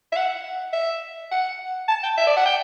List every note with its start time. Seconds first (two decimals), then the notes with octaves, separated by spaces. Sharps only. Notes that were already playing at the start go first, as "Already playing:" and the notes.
0.12 E5
0.16 F#5
0.73 E5
1.31 F#5
1.88 A5
2.03 G5
2.18 E5
2.27 D5
2.36 F#5
2.46 G5